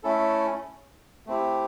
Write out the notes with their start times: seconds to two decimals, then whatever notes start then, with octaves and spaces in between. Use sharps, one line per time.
0.03 A3 C#4 E4 A4
1.27 A3 C4 E4 G4